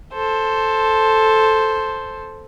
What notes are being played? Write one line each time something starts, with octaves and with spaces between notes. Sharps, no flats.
A4 C5